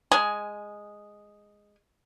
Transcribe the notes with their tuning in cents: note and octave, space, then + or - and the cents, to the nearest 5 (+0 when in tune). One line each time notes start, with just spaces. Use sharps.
G#3 -5 G#5 +10